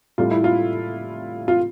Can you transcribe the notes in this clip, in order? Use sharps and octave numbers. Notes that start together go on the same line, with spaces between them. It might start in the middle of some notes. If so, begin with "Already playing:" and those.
A2 G3 F4
E4
F4
F4